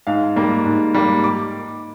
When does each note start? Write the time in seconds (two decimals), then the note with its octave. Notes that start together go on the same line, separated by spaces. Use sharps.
0.07 G#2 F5
0.36 G3 A#3
0.66 G#2
0.94 G3 A#3
1.24 D6